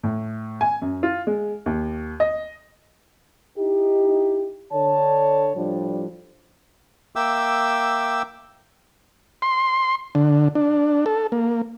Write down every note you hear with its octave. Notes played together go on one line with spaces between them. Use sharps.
A2
G#5
F#2
F4
G#3
D#2
D#5
D#4 E4 G4
D3 C#5 A5
A2 F3 G3 D4
A#3 E5 G5 D6 E6
C6
D3
D4
A4
A#3